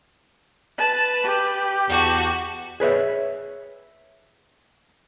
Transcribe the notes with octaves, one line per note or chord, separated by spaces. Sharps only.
B4 A5
G4
E2 F#4 A5
G#4 B4 C#5 E5